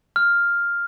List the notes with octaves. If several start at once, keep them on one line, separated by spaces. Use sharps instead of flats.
F6